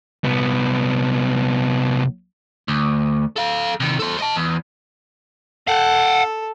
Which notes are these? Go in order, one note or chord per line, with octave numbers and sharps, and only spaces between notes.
C2 B3
D2
A4 F5
C3 D#3
A4 C5
D#5 A5
E2
A4 F5 F#5